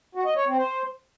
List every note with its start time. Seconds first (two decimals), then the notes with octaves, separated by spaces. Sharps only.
0.15 F#4
0.26 D#5
0.36 C#5
0.47 C4
0.57 C5